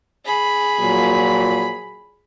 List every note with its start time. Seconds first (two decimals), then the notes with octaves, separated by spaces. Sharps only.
0.25 G#4 B5
0.79 A#2 F3 F#3